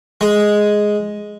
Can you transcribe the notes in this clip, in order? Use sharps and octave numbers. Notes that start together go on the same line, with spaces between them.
G#3